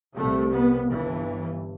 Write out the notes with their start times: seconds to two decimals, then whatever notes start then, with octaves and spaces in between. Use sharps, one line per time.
0.14 C2 C3 A3
0.52 B3
0.89 G1 G2 E3